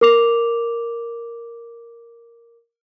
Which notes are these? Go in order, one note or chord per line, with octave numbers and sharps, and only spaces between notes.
A#4 D6 F7